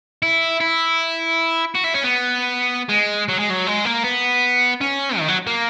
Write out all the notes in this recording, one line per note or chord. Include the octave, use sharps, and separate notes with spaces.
E4
E4
F#4
E4
C#4
B3
G#3
F#3
G#3
F#3
G#3
A#3
B3
C#4
D#3
F#3
A#3